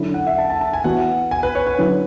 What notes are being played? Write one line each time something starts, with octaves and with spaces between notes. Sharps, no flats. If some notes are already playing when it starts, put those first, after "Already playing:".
Already playing: D3 F#3 C#4 E4
F#5
E5
A5
A5
A5
G#5
E3 B3 F#4 F#5
G#5
B4
C#5
B4
D3 F#3 C#4 E4